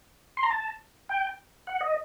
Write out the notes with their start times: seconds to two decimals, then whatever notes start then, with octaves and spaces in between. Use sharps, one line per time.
0.37 C6
0.43 A#5
0.50 A5
1.09 G5
1.67 F#5
1.81 D#5